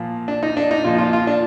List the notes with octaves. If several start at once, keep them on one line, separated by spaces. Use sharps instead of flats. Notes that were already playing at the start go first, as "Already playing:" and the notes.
Already playing: A#2 F3
D4
D#4
D4
D#4
A#2 F3 F4
F4
F4
D4